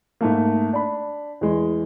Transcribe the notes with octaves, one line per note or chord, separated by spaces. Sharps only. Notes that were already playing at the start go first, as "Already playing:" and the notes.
G#2 A3 A#3
D4 B5
E2 G#3